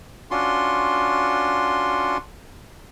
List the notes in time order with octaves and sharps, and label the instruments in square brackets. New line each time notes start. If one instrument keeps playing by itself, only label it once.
[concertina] C#4 D4 F4 F#4 C6